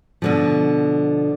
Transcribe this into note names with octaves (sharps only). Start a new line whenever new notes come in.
B2 D3 F3